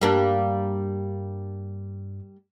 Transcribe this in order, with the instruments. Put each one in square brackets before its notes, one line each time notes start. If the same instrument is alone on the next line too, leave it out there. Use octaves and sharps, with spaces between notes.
[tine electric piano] G2 [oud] G3 A#3 D4